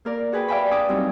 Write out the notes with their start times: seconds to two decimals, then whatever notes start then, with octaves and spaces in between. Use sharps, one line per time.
0.05 A#3 A#4 D5
0.32 F#4 G#4 B4 G5
0.48 D5 E5 F5 G5 G#5 B5
0.71 D4 G#5 D6 D#6
0.89 F#3 G3 C4 D#4